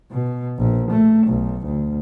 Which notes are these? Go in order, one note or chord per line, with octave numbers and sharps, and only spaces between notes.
B2
A#1
A3
B1
D2